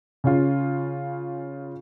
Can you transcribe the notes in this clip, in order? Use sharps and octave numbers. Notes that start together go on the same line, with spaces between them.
C#3 C#4 F4